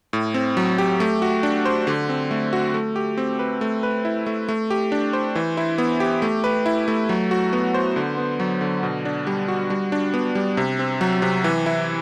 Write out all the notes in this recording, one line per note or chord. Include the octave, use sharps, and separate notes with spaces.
A2
C4
F#3
G4
A3
F#4
D4
C5
D3
C4
A3
F#4
A3
G4
C4
B4
A3
B4
E4
A3
A3
G4
D4
C5
E3
E4
B3
G4
A3
B4
E4
A3
F#3
F#4
B3
C5
D3
B3
F#3
D3
B2
D4
G3
F#4
G3
D4
B3
G3
C3
C4
F#3
C3
E3
E4